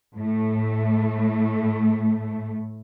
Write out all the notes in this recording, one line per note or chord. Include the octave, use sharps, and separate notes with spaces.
A2 A3